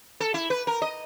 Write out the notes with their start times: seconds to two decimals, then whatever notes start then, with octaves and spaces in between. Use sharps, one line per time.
0.20 A4
0.34 E4
0.50 B4
0.67 A#4
0.82 D#5